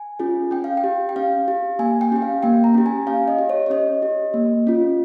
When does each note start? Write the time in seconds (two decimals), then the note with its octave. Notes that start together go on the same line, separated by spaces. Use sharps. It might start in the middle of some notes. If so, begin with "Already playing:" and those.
Already playing: G#5
0.19 C#4 F4 G#4
0.51 C#4 G5
0.64 F5
0.77 G5
0.84 G4
1.09 G5
1.16 C#4 F5
1.48 G4
1.79 A#3 G#5
2.01 G5
2.12 C#4 G4 G5
2.22 F5
2.43 A#3 G5
2.64 A#5
2.74 C#4 G4
2.86 G#5
3.07 C#4 F5
3.28 D#5
3.39 G4
3.49 C#5
3.66 C#5
3.70 C#4 D#5
4.02 G4
4.34 A#3
4.67 C#4 F4